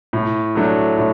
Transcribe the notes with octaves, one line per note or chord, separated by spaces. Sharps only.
A2
F#3 A3 D4
A2